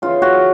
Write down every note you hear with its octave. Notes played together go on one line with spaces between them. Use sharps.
C#3 E3 F4
F#4